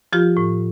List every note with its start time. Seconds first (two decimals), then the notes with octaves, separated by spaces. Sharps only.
0.13 F3 F4 G4
0.37 A2